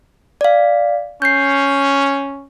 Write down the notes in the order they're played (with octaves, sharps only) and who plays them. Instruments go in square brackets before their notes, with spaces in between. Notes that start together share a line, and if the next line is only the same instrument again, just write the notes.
[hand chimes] D5 F5
[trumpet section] C#4 [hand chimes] G6 C7